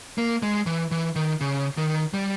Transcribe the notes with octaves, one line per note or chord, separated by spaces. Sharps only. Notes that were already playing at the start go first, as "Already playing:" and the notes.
A#3
G#3
E3
E3
D#3
C#3
D#3
G3